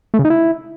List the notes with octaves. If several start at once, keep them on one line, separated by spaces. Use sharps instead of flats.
A3
C#3
D#4
E4